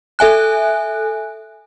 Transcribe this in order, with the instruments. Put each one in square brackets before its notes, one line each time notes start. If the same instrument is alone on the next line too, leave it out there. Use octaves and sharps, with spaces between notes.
[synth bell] A4 E5 G#5 F#6